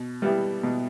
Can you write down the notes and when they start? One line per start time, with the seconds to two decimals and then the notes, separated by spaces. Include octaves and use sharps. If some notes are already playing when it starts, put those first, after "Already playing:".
Already playing: B2
0.22 G3 B3 E4 G4
0.63 B2